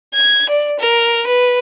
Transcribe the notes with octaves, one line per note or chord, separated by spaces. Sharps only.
G#6
D5
A#4
B4